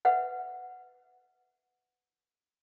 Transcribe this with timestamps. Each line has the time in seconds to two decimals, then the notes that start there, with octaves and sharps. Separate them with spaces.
0.05 B4 E5 F#5